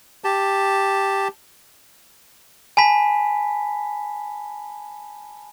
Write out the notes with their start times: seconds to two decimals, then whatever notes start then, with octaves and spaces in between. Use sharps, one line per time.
0.24 G4 A5
2.77 G#5 A5 B5 B6